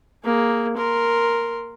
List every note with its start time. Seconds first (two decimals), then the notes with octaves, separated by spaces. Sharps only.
0.24 A#3 G#4
0.77 A#4 C6